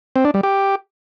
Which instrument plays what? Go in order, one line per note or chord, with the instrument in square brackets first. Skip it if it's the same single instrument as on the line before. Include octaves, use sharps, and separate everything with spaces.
[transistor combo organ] C4
D4
G3
G4